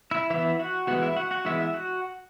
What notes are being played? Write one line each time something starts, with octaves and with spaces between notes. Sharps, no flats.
E4 E5
E3 B3 E4 E5
F#4 F#5
E3 G#3 B3 F#4 F#5
E4 E5
F#4 F#5
F#4 F#5
E3 G#3 B3 E4 E5
E5
F#4 F#5